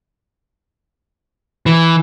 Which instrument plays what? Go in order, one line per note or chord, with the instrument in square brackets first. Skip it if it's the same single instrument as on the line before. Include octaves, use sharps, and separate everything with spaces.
[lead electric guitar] E3